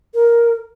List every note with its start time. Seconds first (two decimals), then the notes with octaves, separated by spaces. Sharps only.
0.14 A#4